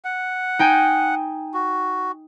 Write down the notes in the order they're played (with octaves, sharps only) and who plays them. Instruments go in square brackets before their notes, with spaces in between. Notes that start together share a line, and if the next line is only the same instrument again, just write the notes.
[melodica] F#5
[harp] D#4 G5 G#5
[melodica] F#4